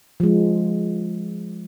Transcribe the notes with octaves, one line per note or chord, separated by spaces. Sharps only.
F3 G#3